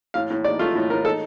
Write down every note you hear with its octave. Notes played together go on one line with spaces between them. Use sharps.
A2 F5
A2
D#4 D5
A3 F4
A2
A2 A#4
D#4 A4